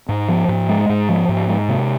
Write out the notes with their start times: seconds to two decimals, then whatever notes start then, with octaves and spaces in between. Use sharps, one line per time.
0.09 G#2
0.28 F3
0.48 G#2
0.69 G#3
0.89 G#2
1.09 F3
1.29 G#2
1.49 G#3
1.68 C3